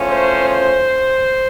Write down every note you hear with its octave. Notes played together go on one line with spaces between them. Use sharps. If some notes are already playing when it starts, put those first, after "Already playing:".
Already playing: E2 C#3 F3 A3 C#4
C5
C5